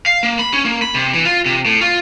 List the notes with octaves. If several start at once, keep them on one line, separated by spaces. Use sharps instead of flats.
F5
A#3
B5
C#4
A#3
B5
C3
E3
F4
C3
A2
F4